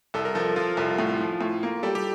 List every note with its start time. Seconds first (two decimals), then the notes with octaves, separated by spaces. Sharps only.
0.14 C2 A4
0.25 A#4
0.35 F3 A4
0.56 F3 F4
0.77 C2
0.98 A2
1.21 F3
1.41 A2
1.63 A#3
1.83 G3 A4
1.95 G4